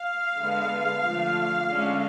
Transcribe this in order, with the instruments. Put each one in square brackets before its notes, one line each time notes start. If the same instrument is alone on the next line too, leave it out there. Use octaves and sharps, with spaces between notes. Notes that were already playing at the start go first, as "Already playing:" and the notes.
Already playing: [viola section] F5
D3 G#3 B3
D3 F3 A3
D3 G#3 C#4